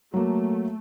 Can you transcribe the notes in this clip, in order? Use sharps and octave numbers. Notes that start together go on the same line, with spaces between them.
F#3 A3 A#3